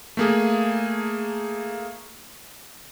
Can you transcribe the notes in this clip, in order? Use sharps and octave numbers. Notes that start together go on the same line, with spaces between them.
A3 A#3 G#4